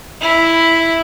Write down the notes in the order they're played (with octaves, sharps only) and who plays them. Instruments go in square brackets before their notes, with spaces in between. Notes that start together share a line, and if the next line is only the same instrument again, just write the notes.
[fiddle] E4